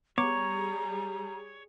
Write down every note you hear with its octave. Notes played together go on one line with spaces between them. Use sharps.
G3 B3 G#4 C#5 A#5 D6